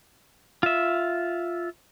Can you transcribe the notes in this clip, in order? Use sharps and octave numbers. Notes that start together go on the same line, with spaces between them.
F4 E5